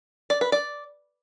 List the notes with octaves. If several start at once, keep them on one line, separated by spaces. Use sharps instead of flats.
D5
B4
D5